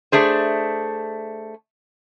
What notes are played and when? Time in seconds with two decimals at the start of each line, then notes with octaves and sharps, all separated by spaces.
0.12 A3 D4 G#4 C5